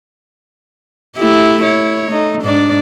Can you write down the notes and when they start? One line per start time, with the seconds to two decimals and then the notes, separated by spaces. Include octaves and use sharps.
1.17 A3 E4 G4
1.62 E4 C#5
2.07 A3 D#4
2.42 G#2 D4 D5